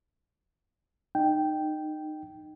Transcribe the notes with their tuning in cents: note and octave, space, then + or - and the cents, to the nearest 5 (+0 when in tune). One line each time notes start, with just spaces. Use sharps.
D#4 -25 G5 -5